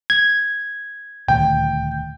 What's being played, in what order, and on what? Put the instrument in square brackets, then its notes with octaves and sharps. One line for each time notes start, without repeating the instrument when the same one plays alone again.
[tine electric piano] G#6
[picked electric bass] D#1 D2 [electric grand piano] G5